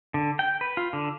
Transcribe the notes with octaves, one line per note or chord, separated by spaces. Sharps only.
D3
G5
B4
F4
D3